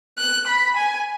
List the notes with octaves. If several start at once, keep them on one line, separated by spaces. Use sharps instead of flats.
F#6
B5
G#5